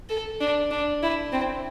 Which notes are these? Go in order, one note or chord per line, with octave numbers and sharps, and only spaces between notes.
A4
D4
D4
E4
C4